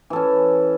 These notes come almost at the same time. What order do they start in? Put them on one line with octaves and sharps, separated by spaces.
E3 A4 C#4